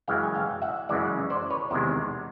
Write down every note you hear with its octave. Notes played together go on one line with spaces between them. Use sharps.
F#2 C#3 E3 G#3 F5 G5
G#5
F5 G5
E5 F#5
F#2 C#3 E3 G#3 D5 E5
C5 D5
B4 C#5
E2 C3 D#3 G#3 A#4 C5